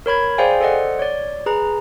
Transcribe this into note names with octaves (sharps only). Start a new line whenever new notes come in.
A#4 C#5 B5 G#6
G#4 C5 D5 F5 G5 G#5
A4 C5 D5 D#5 F#5
C#5 D5
G#4 B4 A#5